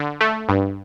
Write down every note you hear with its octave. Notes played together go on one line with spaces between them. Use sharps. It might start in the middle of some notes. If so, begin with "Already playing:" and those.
Already playing: D3
A3
G2